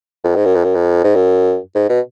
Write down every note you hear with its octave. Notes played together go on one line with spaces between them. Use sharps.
F2
G#2
F#2
F2
F#2
F2
G#2
F#2
G#2
B2